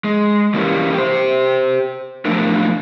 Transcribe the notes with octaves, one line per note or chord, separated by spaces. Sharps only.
G#3
E3 G3 A#3 C#4
G4 C5
F3 F#3 A3 A#3 D4 A#4